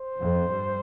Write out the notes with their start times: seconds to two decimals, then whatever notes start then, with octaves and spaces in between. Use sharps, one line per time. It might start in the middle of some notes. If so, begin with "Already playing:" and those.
Already playing: C5
0.20 F2
0.50 G2